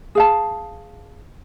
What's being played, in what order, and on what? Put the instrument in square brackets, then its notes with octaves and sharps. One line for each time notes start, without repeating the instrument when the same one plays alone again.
[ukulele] G#4 F5 A5